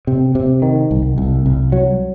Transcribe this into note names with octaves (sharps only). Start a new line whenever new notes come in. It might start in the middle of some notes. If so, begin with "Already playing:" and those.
C3
C3
D#3
C2
C2
C2
F#3